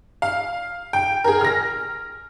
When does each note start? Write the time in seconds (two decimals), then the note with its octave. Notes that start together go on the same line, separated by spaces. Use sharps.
0.22 F5
0.93 G5
1.24 G#4 A#4
1.41 F6 A#6